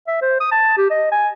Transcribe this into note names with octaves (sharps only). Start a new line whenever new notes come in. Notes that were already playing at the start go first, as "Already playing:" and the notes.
E5
C5
D#6
A5
G4
D#5
G#5